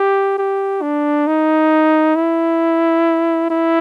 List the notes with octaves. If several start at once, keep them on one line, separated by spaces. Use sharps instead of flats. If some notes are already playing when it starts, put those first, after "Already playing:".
Already playing: G4
G4
D4
D#4
E4
E4